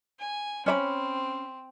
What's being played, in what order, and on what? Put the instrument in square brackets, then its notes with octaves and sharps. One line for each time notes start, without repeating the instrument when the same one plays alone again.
[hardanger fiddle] G#5
[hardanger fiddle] C4 [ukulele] C#4 D5 B5